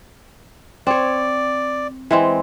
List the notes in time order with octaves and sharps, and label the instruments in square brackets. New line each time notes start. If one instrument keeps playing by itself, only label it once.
[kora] C4 C#5 [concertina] D5
[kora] E3 G#3 C4